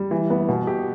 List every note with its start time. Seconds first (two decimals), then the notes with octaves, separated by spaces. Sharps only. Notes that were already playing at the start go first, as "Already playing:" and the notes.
Already playing: G3
0.11 E3
0.30 B3
0.49 B2
0.67 G4